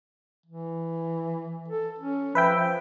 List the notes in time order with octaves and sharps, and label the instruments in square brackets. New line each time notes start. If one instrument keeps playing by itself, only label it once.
[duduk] E3
A4
C#4
[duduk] F3 [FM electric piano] B4 E5 G5